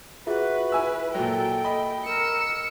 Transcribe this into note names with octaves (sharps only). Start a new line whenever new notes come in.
F4 F#4 G#4 B4 E5
E4 G#5 E6
A#2 F#3 A4 G5
D#5 B5
A#4 E6 C#7